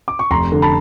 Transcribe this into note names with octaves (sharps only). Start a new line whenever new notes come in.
D6
C#6
F1 A#5 C6
D3
A5 B5